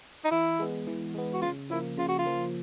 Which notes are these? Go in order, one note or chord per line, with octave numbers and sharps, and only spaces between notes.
D#4
E3 E4
G#3 B3
E3
G#3 B3
F#4
C#3 F4
F3 A#3 E4
C#3 F4
F#4
F4
F3 A#3